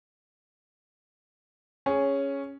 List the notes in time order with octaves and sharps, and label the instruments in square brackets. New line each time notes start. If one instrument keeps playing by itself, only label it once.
[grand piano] C#4 G#4